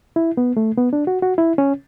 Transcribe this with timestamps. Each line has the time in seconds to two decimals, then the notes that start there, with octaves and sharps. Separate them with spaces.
0.16 E4
0.37 B3
0.57 A3
0.78 B3
0.93 D4
1.07 F#4
1.22 F#4
1.38 E4
1.58 C#4